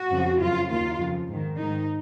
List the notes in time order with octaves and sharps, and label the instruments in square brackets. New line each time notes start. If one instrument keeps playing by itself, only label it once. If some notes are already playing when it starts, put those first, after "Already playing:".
Already playing: [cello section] F#4
F2 C#3 F3
F#2 C#3 F3 F4
D#2 D#3 F4
F2 C#3 F3
G#2 D#3
G#2 D#3 D#4